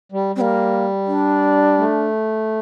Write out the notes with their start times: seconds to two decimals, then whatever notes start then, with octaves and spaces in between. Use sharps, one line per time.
0.12 G3
0.36 G3 C4
0.41 A#3
1.07 D4
1.78 A3